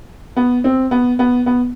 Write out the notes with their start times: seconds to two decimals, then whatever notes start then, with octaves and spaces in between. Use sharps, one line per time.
0.37 B3
0.64 C4
0.91 B3
1.19 B3
1.46 B3